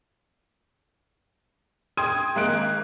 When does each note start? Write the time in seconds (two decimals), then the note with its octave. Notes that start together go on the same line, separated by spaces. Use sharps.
1.97 G5 C6 D#6 G#6 D#7
2.35 G#1 G#3 A#3 F#6 D7